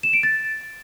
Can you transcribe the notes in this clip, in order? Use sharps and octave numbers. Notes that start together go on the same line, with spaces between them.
E7
D7
A6